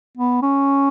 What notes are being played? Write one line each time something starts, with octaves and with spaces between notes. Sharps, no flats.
B3
C#4